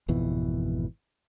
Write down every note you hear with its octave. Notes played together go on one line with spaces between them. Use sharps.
G#1 F2 B2 E3